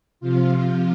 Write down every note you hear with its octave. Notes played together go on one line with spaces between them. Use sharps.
C3 F3 F4